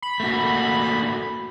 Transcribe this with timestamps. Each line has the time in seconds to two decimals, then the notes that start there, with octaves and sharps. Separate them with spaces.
0.02 B5
0.20 A3 A#3 F#4